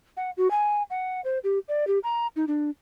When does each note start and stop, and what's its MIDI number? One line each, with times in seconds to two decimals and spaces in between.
0.17 0.31 78
0.37 0.50 66
0.51 0.83 80
0.90 1.21 78
1.24 1.39 72
1.44 1.59 67
1.68 1.87 74
1.87 1.99 67
2.03 2.27 82
2.36 2.45 63
2.48 2.70 62